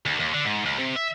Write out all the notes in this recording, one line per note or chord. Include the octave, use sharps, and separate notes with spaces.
D2
D#2
D3
G#2
C#2
C3
E5